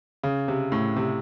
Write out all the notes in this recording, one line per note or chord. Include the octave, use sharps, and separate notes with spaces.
C#3
C3
A2
C3